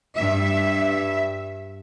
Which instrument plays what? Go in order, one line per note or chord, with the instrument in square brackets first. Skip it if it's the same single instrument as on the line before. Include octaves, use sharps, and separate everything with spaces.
[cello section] G2 E5